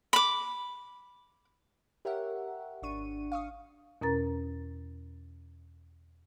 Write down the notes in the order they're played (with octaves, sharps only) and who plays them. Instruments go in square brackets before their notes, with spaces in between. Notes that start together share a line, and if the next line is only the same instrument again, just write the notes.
[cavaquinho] B5 D6
[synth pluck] G4 A#4 C#5 E5 F#5
G#1 D4 C#6 D#7
F5 C#6 D#6
[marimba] E2 B2 C#4 A#4 A#5 A6